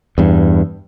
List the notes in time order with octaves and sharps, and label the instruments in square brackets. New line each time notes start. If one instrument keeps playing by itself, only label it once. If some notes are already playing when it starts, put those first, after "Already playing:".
[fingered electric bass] E2 G2